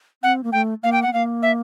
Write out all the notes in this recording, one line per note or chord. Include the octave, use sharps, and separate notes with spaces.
C4 F#5
A#3
A3 G5
A#3 F5
G5
B3 F#5
A#3 F5
E5